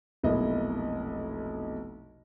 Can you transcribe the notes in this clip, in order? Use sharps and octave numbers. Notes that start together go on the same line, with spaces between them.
F1 B1 A#3 E4 D#5